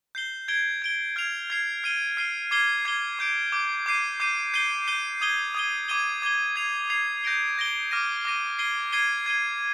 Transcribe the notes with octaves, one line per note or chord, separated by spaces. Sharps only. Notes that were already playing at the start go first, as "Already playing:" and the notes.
G6 C7 G7
G#6 D7 G7
G#6 D7 G7
F6 G#6 C7 F7
F6 G#6 C7 F7
F6 C7 D#7 G7
F6 C7 D#7 G7
D6 G#6 C7 G7
D6 G#6 C7 G7
D6 G6 D7
D6 G6 D7
D6 G6 C7 D#7
D6 G6 C7 D#7
G6 C7 D#7 G7
G6 C7 D#7 G7
D#6 G#6 D#7 G7
D#6 G#6 D#7 G7
D6 G#6 D#7 G7
D6 G#6 D#7 G7
G#6 C7 F7
G#6 C7 F7
G6 A#6 D7 G7
G6 A#6 D7 G7
D6 F6 A#6 D#7
D6 F6 A#6 D#7
G#6 C7 D#7 G7
G#6 C7 D#7 G7
G#6 D#7 G7